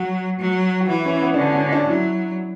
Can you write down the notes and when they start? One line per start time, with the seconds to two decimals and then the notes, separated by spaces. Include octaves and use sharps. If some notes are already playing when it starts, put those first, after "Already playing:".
Already playing: F#3 F#4
0.40 F#3
0.80 F#4
0.89 E3 E4
1.05 C#4
1.22 B3
1.34 D4
1.38 D3 C#4
1.55 C#4
1.72 D4
1.88 F#3 E4